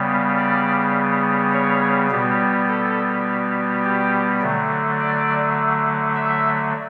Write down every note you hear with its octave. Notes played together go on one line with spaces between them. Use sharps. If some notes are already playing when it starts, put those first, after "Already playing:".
Already playing: C#3 G3 B3
D5
C#5
B2 G3 B3
A4
G4
D3 F#3 A3
D5
E5